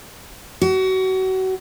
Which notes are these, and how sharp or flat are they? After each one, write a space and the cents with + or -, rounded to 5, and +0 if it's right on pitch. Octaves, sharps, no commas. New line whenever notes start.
F#4 +30